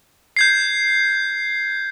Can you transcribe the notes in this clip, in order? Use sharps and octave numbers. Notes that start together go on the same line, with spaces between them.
G6 G#6 C7